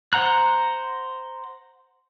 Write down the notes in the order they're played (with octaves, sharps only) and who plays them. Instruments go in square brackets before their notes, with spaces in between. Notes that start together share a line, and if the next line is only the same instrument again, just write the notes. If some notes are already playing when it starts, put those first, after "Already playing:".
[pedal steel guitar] C5 F#5 A#5 F#6